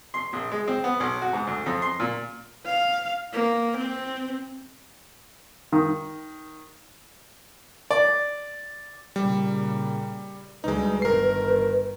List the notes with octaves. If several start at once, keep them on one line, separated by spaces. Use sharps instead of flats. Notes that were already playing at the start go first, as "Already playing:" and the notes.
C6
A#1
G#3
C4
B3
B1
F#4
G#2
D2
F2
C6
A#2
F5
A#3
C4
D#3
D5
A#2 C#3 G3
D2 G3 G#3 D#4 B4
G1 D#3 A#4 C7